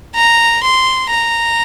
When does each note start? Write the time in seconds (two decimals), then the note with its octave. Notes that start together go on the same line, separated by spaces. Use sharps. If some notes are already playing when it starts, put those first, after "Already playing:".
0.15 A#5
0.63 C6
1.11 A#5